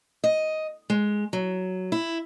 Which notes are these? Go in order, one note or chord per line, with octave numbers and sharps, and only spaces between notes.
D#5
G#3
F#3
E4